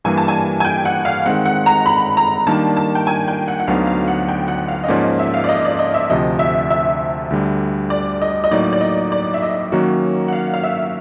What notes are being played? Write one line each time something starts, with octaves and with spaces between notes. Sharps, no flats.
G2 E3 G3 A#3 G#5
A5
G#5
G#5
G5
F#5
F5
D#3 G#3 C4 F#5
F#5
A#5
B5
A#5
D#3 G3 A#3 D4 A5
A5
G5
G#5
G5
F#5
F#5
D2 D3 F#3 B3 D#4 F5
F5
F#5
G5
F#5
F5
D#5
G#2 F3 A#3 C#4 D5
D#5
E5
F5
D5
D#5
D5
D#5
E5
D2 C3 F3 D#5
E5
E5
D2 D3 G3
D5
D#5
D#5
A2 F#3 A#3 D#4 D5
D5
D#5
D5
E5
D#5
D#3 F#3 A#3 C#4 F#4
F#5
F5
F5
E5